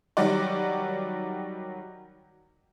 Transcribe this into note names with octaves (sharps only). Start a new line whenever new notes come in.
D#3 F#3 G3 F#4 D5